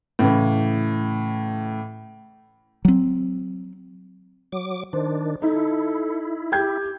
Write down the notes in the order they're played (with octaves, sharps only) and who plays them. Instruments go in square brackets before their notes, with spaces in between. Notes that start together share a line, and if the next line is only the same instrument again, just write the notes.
[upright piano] A2 C#3 E3
[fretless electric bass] F#3 C4
[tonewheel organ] F#3 D6
[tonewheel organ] D#3 D4 [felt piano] C5
[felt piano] D#4 [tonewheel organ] E4 [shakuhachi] A4
[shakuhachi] G4 [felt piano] G5 G6 G#6